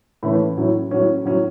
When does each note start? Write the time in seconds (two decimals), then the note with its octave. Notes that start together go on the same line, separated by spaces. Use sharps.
0.23 A2 E3 A3 C#4 B5
0.57 A2 F#3 C#4
0.91 A2 F#3 C#4
1.25 A2 F#3 C#4